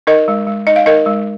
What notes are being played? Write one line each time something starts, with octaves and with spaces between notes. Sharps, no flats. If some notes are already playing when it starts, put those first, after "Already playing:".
D#4 A#4 D#5
G#3
G#3
D#4 D#5
F5
D#4 A#4 D#5
G#3